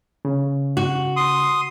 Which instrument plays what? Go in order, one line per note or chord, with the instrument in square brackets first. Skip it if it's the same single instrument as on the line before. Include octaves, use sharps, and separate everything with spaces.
[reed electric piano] C#3
[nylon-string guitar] F#4
[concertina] C6 D#6